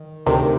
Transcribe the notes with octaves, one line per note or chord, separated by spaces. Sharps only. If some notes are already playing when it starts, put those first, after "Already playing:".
Already playing: D#3
D2 C3 D#3